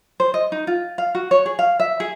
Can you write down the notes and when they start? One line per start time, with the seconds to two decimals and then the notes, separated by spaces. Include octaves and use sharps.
0.20 C5
0.34 D#5
0.52 D#4
0.67 F4
0.98 F5
1.15 F#4
1.31 C#5
1.46 G#4
1.59 F5
1.80 E5
2.00 G#4